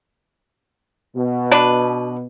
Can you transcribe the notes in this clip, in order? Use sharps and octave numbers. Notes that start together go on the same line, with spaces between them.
B2
D4 B4